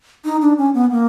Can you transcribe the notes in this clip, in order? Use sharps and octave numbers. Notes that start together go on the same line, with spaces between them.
D#4
D4
C#4
B3
A#3